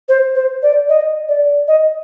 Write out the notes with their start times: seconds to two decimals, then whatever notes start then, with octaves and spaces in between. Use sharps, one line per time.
0.09 C5
0.35 C5
0.63 D5
0.89 D#5
1.29 D5
1.68 D#5